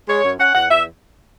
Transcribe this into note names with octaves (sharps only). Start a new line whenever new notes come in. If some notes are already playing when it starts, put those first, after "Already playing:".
G#3 C#5
F#2
C#4 F#5
E2 F#5
E2 E5